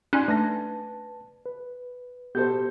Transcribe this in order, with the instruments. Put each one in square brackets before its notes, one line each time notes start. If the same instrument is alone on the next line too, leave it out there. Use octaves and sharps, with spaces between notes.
[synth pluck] C#4 D#4 [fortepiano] D5 G#5 C6 [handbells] F#6
[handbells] A3 D4 A#6 [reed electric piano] B4 A5
[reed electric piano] B4
[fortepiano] B2 A4 C5 [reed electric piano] B3 G4 G6